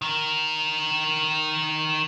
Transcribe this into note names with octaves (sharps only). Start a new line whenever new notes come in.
D#3 A#4